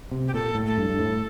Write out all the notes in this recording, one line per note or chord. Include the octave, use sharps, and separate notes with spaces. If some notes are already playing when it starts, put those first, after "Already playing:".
C3
G4
A#2 A4
A2
A4
G2
G2
A2